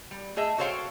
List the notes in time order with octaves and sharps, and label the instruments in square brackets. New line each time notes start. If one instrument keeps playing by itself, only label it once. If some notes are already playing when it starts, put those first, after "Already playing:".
[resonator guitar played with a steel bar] G3
A3 G#4 D#5 E5
F#4 A4 C5 C#5 F5 G5